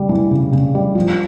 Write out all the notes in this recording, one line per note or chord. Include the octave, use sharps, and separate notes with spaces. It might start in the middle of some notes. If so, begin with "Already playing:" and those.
Already playing: C#3 G3
E3
C#3
C#3
G3
F3